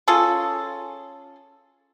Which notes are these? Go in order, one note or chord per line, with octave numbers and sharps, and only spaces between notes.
C#4 F4 G#4 A4